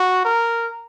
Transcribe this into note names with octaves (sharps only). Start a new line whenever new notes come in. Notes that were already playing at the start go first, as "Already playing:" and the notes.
Already playing: F#4
A#4